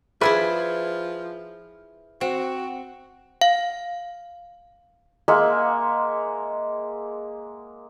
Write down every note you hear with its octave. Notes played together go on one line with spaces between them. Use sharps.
F3 E4 G#4 B4 D5 E5 B5
C4 F#4
F5
G#3 A#3 E5 F#5